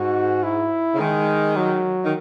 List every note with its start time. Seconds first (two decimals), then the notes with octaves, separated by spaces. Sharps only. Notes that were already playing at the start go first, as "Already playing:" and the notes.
Already playing: G#2 F#4
0.43 E4
0.94 C#3
0.99 D#3 G#3
1.56 F#3
2.04 D#3